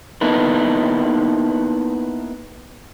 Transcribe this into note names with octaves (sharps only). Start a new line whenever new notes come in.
A#3 B3 D#4 E4 A4 B4